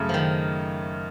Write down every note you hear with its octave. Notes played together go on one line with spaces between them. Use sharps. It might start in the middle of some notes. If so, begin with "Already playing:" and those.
Already playing: F#2 C#3 A3
D#3 F3